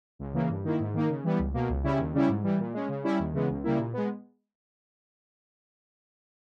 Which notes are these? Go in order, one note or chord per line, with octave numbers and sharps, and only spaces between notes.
C#2
C#3 E3 A#3
G2
D#3 A#3 E4
G#2
D#3 A#3 D#4
C#3
E3 G3 B3
C#2
B2 A#3
C#2
C#3 G3 C#4 E4
D#2
C#3 G3 C#4 E4
G#2
E3 G3
A#2
G#3 C#4
C#3
G3 C#4 E4
D#2
C#3 E3 G#3 B3
C#2
C#3 G3 A#3 E4
A#2
G#3 B3